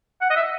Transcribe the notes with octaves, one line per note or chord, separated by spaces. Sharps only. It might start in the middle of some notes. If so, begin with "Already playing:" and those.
F#5
D#5
E5